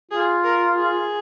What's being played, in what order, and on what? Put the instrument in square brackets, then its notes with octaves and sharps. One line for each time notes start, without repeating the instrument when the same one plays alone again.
[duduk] F4 [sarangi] G#4
[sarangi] A#4
G#4